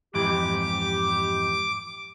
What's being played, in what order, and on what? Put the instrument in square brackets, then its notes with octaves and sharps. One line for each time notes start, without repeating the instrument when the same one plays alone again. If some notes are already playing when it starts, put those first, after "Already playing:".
[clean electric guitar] F2 G#2 E3 [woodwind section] G4 [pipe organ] D6